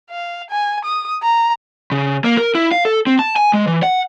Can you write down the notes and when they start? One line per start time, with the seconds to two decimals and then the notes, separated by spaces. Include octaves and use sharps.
0.10 F5
0.50 G#5
0.85 D#6
1.22 A#5
1.92 C#3
2.24 A#3
2.37 A#4
2.55 E4
2.72 F5
2.85 A4
3.07 C4
3.19 A5
3.36 G#5
3.53 G#3
3.67 E3
3.83 F#5